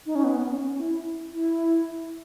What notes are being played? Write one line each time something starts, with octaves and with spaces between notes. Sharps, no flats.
D#4
C#4
B3
B3
C#4
C#4
E4
E4